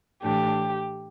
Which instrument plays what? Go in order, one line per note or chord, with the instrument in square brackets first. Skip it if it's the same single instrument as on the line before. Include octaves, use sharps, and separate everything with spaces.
[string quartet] A2 E3 A3 D4 G4